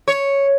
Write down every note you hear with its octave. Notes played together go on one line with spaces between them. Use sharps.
C#5